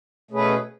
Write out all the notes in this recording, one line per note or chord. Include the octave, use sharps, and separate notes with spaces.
B2 A3 C#4 G#4 B4